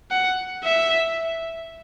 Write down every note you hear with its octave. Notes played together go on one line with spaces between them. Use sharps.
F#5
E5